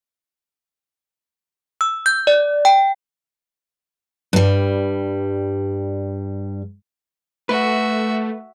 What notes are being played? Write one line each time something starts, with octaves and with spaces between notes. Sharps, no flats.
E6
G6
D5
G5
G2 G3
A3 F#4 B4 E5